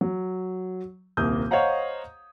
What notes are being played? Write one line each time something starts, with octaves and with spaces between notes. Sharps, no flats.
F#3
D#1 C2 A#3 D#6 G6
C5 C#5 D#5 F5 F#5 A#5